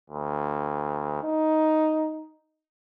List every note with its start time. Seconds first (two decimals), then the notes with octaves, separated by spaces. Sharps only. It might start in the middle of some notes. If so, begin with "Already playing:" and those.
0.10 D2
1.23 D#4